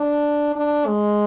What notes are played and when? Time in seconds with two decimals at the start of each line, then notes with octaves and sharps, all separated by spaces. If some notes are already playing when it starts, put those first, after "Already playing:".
Already playing: D4
0.55 D4
0.87 G#3